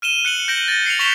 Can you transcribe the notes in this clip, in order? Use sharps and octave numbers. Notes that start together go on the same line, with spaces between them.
F6 D#7 E7 G7
F#6 C#7 D#7 F#7
G6 A#6 D7 F#7
A6
C7 C#7 F7
C#6 A6 B6 E7 F7 G7